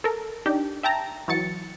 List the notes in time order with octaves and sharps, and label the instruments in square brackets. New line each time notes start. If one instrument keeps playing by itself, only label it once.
[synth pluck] A4 A#4
D4 D#4 G4
E5 G5 A5 A#5
E3 F#3 A6 C#7